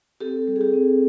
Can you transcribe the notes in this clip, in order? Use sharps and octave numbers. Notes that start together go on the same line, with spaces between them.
C4 G4 A4
G3
G#4
G4
C4